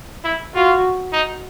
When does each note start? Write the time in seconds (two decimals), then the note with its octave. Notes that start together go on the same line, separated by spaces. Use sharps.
0.24 E4
0.54 F4 F#4
1.13 D#4